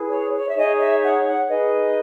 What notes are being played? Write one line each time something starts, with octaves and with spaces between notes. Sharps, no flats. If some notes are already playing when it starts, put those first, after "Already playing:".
Already playing: E4 G#4 B4
C#5
C#5
E5
D#4 G#4 C#5 D#5
E5
F#5
F#5
D#4 G#4 B4 D#5